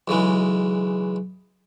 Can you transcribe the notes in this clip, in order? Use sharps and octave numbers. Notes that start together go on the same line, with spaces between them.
B1 C#3 E3 G#3